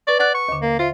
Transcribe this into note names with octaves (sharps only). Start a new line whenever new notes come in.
B4 D5 C#6
D5 F#5 F#6
C#6
D#2 D3
A#3
F4 C5 E5